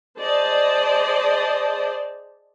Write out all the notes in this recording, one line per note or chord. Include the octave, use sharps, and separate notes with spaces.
G#4 C5 D5 D#5 A5